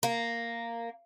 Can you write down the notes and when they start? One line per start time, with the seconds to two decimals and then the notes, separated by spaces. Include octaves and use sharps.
0.03 A#3